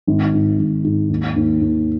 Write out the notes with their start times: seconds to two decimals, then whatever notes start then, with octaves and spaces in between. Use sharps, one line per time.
0.07 G#1
0.34 G#2
0.59 G#1
0.84 G#2
1.09 D#2
1.36 D#2
1.61 D#2